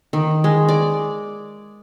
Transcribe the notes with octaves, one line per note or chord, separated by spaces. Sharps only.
D#3
G#3
D5